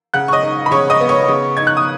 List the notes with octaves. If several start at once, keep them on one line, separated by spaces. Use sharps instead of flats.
C#3 F#5 F#6
C#6
D#5 D#6
D#4
B5
C#3 C#5 C#6
D#5 D#6
B3
C#5 C#6
C#3
D#4 G#6
F#6
D#6